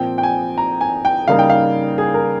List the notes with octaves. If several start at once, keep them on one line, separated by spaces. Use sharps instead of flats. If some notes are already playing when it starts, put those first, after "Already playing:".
Already playing: A#2 F3 C4 G5
G5
G#5
A#5
G#5
G5
C#3 G3 A#3 D#4 F5
G5
F5
G#4
A#4